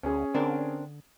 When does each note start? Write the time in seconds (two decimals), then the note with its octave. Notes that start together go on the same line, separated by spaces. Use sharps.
0.03 D2 C#4 G#4
0.34 D3 C4 D4 A#4